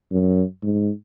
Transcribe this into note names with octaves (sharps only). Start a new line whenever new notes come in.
F#2
G#2